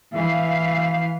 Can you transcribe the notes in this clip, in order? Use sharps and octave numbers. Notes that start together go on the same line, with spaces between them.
E3 E5 F5